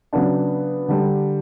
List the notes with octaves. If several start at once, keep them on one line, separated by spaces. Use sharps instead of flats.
C#3 F#3 B3 D4
D3 G3 D4